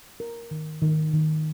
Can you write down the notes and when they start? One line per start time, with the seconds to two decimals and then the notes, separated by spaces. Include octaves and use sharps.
0.20 A#4
0.51 D#3
0.82 D#3
1.13 D#3